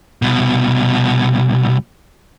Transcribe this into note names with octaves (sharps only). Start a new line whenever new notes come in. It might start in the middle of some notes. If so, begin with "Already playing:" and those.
C2 B2